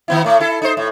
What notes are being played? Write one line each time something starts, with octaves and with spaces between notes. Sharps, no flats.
D#3 B3 E4
A2 A3
E4 A4
D#4 C5
A2